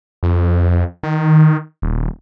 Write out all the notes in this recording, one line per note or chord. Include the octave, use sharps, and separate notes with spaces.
F2
D#3
D#1